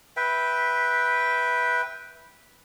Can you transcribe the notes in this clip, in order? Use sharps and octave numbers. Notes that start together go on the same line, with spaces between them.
B4 E5 G5